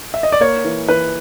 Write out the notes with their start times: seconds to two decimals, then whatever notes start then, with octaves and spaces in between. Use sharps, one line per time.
0.14 E5
0.23 D#5
0.32 D5
0.41 A#3 C#5
0.65 E3
0.88 E3 B4